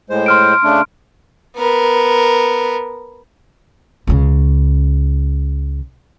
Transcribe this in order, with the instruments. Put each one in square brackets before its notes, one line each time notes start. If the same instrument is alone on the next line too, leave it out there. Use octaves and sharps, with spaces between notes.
[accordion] A2 G#3 C5
[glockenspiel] C6 F6 D7
[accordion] C#3 A3 D4
[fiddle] B3 A#4
[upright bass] C#2 C#3